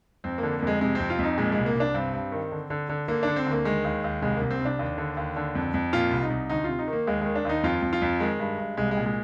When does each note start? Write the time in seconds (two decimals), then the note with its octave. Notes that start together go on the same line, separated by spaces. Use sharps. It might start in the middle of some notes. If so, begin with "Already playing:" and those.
0.24 F2 C4
0.38 D3 A#3
0.59 A#3
0.62 F2 G#3
0.81 C3 G#3
0.95 F2 C4
1.10 F4
1.19 F2 D#4
1.37 A#2 G#3
1.52 G#3
1.57 C2
1.66 A#3
1.76 C2 D4
1.94 G2 C4
2.14 G2
2.32 D#3
2.52 D3
2.70 D3
2.89 D3
3.08 D3 A#3
3.23 D3 D4
3.36 C4
3.46 D2
3.51 A#3
3.65 D#3 G#3
3.84 D#2
4.04 D#2
4.22 C2 G#3
4.37 C2 A#3
4.50 C4
4.60 C2 D4
4.79 D#2
4.98 D3
5.17 D#2
5.36 D3
5.55 F2
5.74 F2
5.93 A#2 F4
6.12 C2
6.22 D#4
6.30 C2
6.49 D2 D#4
6.64 C3 F4
6.79 D#4
6.88 D#3
6.93 A#3
7.07 D#2 G#3
7.21 D#3 G#3
7.35 D4
7.45 D#2 D#4
7.63 F2 F4
7.82 F2
7.93 F4
8.02 F2
8.20 D#3 G#3
8.39 G2
8.58 G2
8.77 C2 G#3
8.91 G#3
8.97 A#2
9.06 G#3